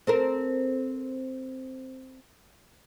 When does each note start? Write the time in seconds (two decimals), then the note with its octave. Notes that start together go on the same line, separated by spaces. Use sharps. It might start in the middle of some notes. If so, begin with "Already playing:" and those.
0.07 C4 A4 A#4